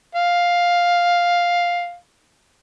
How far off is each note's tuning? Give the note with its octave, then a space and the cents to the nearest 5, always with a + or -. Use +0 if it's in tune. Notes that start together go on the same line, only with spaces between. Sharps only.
F5 +5